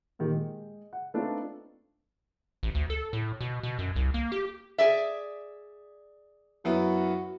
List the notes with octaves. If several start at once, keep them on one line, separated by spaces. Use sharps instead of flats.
A#2 D#3 G4
G#3
F#5
A3 B3 C4 D4 D#4 F4
A1
D2
A4
A2
B2
B2
F#2
C2
A#3
G4
G#4 D5 E5
F#2 B3 E4 F#4